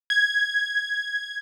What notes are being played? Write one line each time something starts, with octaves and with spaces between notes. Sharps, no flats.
G#6